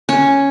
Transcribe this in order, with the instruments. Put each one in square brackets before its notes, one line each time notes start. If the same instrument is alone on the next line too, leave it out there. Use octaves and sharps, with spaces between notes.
[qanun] C#4